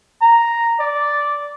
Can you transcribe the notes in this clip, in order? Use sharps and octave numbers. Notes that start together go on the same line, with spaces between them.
A#5
D5